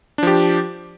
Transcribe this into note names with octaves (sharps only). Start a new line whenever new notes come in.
F3 D4 G4